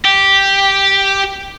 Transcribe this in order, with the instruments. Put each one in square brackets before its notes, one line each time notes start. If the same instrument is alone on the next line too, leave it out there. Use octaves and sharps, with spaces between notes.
[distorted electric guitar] G4